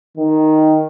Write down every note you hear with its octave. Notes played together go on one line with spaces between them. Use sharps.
D#3